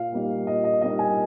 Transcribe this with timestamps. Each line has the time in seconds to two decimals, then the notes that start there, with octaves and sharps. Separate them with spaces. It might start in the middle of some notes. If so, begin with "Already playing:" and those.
Already playing: A#2 F5
0.12 G3 A#3 D#4
0.47 A#2 D#5
0.64 D#5
0.82 G3 A#3 D#4 D#5
0.99 G#5